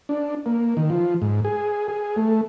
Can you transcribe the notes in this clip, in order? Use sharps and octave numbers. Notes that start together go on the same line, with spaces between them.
D4
A#3
D#3
F3
G#2
G#4
G#4
A3